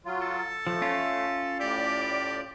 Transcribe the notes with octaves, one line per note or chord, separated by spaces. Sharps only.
F#3 F4
A4
F3 A3
C#4 F4
A2 G4 D5